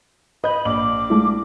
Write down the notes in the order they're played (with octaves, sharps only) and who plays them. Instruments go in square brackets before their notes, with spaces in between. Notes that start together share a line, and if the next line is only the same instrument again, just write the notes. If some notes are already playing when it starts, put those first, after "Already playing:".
[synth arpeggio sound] B4 G6 [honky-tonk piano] D#5 [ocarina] B5
[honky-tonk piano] A#1 F#7 [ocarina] D6
[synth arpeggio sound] G#3 A3 E4